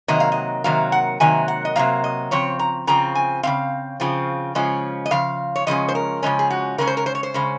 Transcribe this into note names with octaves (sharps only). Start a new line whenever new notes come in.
C3 D#3 F#3 A#3 D#5
F5
D#5
C3 D#3 F#3 A#3 F5
F#5
C3 D#3 F#3 A#3 G#5
F#5
D#5
C3 D#3 F#3 A#3 F5
D#5
C#3 F3 C4 C#5
A#5
C#3 F3 C4 A#5
G#5
C#3 F3 C4 F5
C#3 F3 C4
C#3 F3 G#3 C#4
D#5
C#3 F3 F5
C#5
C#3 F3 G#3 C#4 D#5
C5
A#4
C#3 F3 G#3 C#4
G#4
F#4
C#3 G#3 C#4 A#4
C5
A#4
C5
C#5
C5
C#3 G#3 C#4